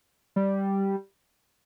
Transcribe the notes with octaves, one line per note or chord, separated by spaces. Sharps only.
G3